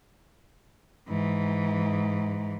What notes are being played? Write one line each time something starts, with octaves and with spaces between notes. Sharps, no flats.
G#2 E3